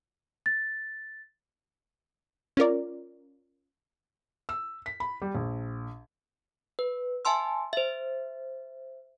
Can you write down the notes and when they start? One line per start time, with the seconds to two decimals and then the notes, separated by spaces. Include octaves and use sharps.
0.46 A6
2.57 C#4 F4 A#4 D5
4.49 E6
4.86 B6
5.00 B5
5.22 G3
5.35 A#1
6.79 B4
7.25 E5 G#5 A5 C6 E6
7.73 C5 E5